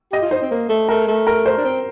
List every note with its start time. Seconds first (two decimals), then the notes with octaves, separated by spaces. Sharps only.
0.12 G4 D#5
0.22 F4
0.31 D#4 C5
0.42 C4
0.51 A#3
0.69 A3
0.89 A3 A#4
1.08 A3
1.27 A#4
1.46 C5
1.58 D4
1.65 C4